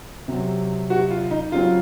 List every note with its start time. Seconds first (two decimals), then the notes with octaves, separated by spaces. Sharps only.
0.28 C3 F#3 C4
0.90 F#4
1.10 F4
1.31 D#4
1.52 C#3 F#3 C4 F4